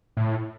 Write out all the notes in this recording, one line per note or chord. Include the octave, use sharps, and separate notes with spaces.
A2